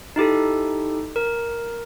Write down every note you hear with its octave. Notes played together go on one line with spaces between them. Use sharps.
D#4 E4 G4 A4
A#4